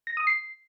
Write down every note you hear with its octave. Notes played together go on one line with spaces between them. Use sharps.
A#6
D#6
C7